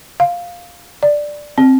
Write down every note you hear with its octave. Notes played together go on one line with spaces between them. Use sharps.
F5
D5
C4